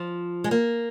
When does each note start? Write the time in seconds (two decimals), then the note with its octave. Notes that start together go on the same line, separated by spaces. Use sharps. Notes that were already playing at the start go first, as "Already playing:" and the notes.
Already playing: F3
0.44 G#3
0.51 A#3